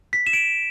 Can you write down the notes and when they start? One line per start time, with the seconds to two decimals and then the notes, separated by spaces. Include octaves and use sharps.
0.13 B6
0.27 E7
0.33 D7